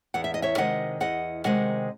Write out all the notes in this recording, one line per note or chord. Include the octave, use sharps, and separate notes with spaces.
E2 F#5
E5
D#5
C#5 E5
C3 D#3 G#3 D#5 F#5
E2 D#5 F#5
C3 D#3 G#3 D#5 F#5